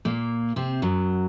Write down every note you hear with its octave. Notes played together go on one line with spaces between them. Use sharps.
A#2 A#3
C3 C4
F#2 F#3